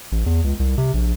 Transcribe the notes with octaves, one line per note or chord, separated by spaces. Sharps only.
A1
E2
C#2
C2
C3
A#1